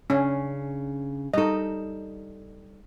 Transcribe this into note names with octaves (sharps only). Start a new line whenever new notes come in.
C#3 C#4 D4
G3 D#4 A4 D#5